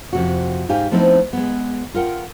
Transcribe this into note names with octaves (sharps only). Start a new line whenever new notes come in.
F2 C3 F#4
G#2 D#4 G4 F5 G#5
F3 A3 B3 C4 D#4 E4
G#3 B3
F4 A#4 F#5 G5